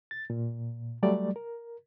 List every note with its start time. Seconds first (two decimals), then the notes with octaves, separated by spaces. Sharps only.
0.11 A6
0.30 A#2
1.03 F#3 G3 A3 D5
1.36 A#4